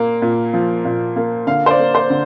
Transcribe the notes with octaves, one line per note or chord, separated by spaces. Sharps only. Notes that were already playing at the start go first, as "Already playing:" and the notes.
Already playing: A#2 A#3
A#2
F3
A#2
A#3
D3 F5
C5
D5
A#3
C5
D3